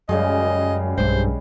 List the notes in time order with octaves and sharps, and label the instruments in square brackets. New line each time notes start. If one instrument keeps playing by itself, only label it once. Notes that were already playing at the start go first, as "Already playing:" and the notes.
[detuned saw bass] F#2 [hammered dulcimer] C#3 G3 G#3 [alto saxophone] D#5
[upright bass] B1 G#3 [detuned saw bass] G2 [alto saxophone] C5